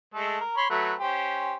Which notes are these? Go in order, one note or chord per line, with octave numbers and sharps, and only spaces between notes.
G#3 A3 A4
A#4
C#5 B5 C6
F#3 A3 B4
C#4 G4 C5